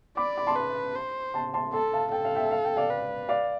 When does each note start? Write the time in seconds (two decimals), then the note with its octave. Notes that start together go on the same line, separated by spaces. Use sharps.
0.17 D5 B5 D6
0.37 B5 D6
0.47 A5 C6
0.56 B4
0.96 C5
1.34 A5 C6
1.54 A5 C6
1.73 A4 A5 C6
1.93 F5 A5
2.12 A4 G5
2.25 F5
2.35 E5 G5
2.51 F5
2.65 G5
2.77 D5 F5
2.90 B4
3.29 D5 F5